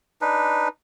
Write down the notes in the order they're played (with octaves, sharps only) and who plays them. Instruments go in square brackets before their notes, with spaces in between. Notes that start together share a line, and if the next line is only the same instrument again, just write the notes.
[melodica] D4 D#4 B4